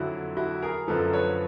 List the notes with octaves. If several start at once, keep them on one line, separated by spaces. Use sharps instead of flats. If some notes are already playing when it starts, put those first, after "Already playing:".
Already playing: F2 D3 F#3 E4 F#4
E4 F#4
G#4 A#4
F#2 D3 F3 A4 B4
B4 C#5